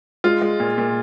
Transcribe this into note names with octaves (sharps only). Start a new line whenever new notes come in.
G#3 F4
G#3
A#2
A#2